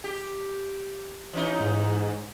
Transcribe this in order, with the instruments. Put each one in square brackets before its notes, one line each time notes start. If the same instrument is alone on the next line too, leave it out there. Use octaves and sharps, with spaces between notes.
[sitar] G4
E3 C#4 D#4
[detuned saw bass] G#2